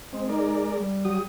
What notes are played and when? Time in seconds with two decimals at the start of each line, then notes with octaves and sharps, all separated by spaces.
0.13 G#3 C4
0.29 G#3 D#4 A#4 D5
0.76 G3
1.05 F#3 G4 D#6